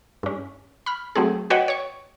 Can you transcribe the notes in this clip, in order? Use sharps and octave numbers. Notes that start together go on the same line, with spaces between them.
G2 C#4
B5 F6
F#3 A3 C4 G#4
F#4 B4 C#5 D#5 F#5 G5
C#5 C#6